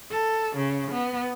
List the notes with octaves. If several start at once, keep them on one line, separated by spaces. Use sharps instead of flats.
A4
C#3
B3